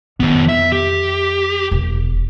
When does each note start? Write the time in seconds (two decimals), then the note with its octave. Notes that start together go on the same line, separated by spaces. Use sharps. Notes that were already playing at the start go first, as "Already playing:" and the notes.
0.20 F2 D#3 B3
0.49 E5
0.72 G4
1.71 E1